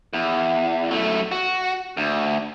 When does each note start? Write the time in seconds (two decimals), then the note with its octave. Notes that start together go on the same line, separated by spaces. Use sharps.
0.13 E2
0.91 F#2 A3
1.32 F#4
1.97 D2